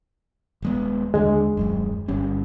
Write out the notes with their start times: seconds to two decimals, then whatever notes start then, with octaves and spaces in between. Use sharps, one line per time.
0.62 D#1 G#3 B3
1.14 D#2 D3 G#3
1.57 D#1 C2 F#2
2.08 G1 G3 C#4